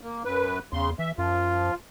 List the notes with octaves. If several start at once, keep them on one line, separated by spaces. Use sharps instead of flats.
A#3
F#2 B4
E2 C#3 C6
E3 E5
F#2 F3 F4